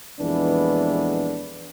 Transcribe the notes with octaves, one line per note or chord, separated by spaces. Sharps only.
A#1 F2 E3 G#3 B3 D4